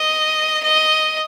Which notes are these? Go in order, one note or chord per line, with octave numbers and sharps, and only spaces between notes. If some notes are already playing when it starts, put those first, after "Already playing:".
Already playing: D#5
D#5